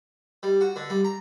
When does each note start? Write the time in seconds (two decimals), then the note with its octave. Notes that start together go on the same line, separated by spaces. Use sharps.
0.43 G3
0.61 F#4
0.76 D3
0.90 G3
1.05 A#5